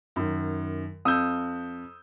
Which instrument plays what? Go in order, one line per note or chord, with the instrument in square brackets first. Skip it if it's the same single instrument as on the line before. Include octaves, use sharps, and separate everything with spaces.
[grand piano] F#2 D#3
[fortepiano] F2 [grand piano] D#6 E6 G6